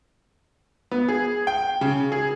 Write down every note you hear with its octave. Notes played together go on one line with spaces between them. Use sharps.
B3
G#4
G5
C#3
G#4